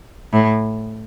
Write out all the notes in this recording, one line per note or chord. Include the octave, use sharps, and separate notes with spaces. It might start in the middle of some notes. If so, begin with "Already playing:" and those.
A2